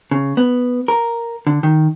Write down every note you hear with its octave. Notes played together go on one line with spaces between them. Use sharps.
C#3
B3
A#4
D3
D#3